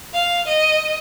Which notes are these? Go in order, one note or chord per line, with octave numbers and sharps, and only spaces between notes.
F5
D#5